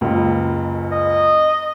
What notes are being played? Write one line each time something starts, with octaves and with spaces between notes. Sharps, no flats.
F#1 C#2
D#5